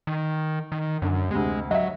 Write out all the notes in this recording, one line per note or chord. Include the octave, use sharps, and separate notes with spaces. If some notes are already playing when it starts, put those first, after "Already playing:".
D#3
D#3
F#2 D3
D2 C3 G#3
F#3 D#5 E5